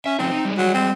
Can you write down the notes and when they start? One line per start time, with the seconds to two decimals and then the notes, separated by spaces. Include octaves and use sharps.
0.06 C#4 E5
0.19 F3 C4 C#4 D#4
0.31 D#4
0.45 G3 G#3
0.57 F#3
0.74 C4